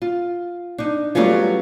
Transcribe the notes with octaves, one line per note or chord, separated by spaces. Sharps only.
F4
D4 D#4
F#3 G3 A3 B3 C#4 F4